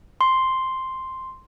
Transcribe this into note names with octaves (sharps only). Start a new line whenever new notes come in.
C6